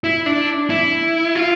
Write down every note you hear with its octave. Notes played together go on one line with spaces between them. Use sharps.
E4
D4
E4
F4